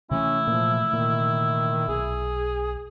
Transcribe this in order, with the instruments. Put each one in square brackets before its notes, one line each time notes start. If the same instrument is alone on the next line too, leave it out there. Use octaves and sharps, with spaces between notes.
[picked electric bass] C3 E3 A3 [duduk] C#4 [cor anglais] E4
[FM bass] A#2 [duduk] F3
[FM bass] A#2 [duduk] D#3
[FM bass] B1 [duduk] G#4